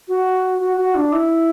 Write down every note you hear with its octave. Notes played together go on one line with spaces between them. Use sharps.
F#4
F#4
F#4
D4
E4